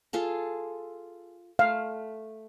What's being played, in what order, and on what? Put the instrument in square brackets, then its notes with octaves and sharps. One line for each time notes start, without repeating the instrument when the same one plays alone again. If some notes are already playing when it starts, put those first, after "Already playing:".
[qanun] F4 G#4 A4
[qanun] A3 [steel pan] F5